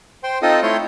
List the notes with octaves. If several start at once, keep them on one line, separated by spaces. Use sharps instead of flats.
C5 G5 C6
C4 D#4 F4 A4 D#5 D#6
A3 E4 C#5 C6 G6